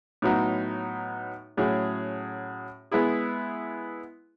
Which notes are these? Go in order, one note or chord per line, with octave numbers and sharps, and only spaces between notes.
A2 F#3 B3 D#4
A2 F#3 C#4 G#4
G#3 B3 E4 G#4